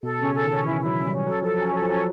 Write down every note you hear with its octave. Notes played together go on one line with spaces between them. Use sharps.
B2 A4
C#3 C#4
A4
D#3
C#4
E3 E4
F#3 E4
C#4
G3 C#4
F#3 A4
F3 A4
F#3 C#4
F#3 A4
F3
F#3 C#4